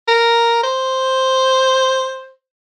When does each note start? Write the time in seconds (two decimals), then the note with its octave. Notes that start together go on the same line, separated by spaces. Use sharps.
0.08 A#4
0.63 C5